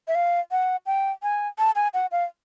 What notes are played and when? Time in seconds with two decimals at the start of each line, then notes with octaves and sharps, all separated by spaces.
0.08 E5
0.15 F5
0.51 F#5
0.86 G5
1.23 G#5
1.58 A5
1.76 G#5
1.94 F#5
2.12 F5